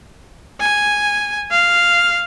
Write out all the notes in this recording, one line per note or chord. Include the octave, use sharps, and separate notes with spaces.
G#5
F5